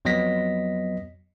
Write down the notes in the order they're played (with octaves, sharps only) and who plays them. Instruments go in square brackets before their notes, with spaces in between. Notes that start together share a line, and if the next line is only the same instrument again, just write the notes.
[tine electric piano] F2 F#3 B3 D#5 A#6 B6